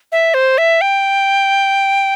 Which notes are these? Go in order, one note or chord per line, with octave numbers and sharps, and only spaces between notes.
E5
C5
E5
G5